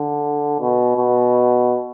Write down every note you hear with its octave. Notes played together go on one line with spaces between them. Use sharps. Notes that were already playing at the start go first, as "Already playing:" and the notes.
Already playing: D3
B2
B2